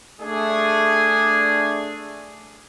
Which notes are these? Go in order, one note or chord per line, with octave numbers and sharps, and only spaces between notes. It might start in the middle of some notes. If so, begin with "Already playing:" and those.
A3 D4 G#4